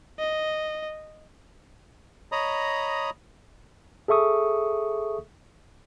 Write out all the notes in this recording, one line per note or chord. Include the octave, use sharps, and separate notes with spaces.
D#5
C#5 D#5 A#5 B5 D#6
G#4 A4 E5 C#6 D#6